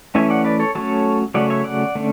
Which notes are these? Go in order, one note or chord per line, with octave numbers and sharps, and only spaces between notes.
E3 A3 C#4 E5 G#5
D5 F#5
B4 D5
A4 C#5
F#3 A3 C#4 A4 C#5
C#3 F#3 A3 C#4 D5 F#5
C#5 E5
D5 F#5
D3 A3 C#4